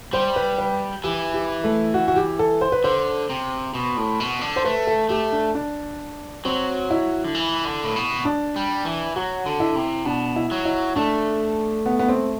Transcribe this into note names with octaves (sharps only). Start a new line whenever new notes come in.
G3 C5
B4
B4
E3 G4
G4
A3
F#4
F#4
G4
A4
C5
B4
D3 C5
C3
B2
A2
B2
D3
C5
A3 B4
A4
A3 G4
D4
D4
F#3 C4
E4
D3
E3
D3
A2
B2
D4
G3
E3
F#3 F#4
D3
E4
C3
B2 D4
E4
F#3
E4
A3 D4
B3
B3
C4